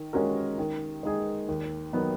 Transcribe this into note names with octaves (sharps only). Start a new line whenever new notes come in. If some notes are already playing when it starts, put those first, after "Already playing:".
Already playing: D#3
G#3 C#4 F#4 A#4
D#3
G#3 D#4 G#4
D#2
D#3 F#3 B3 D#4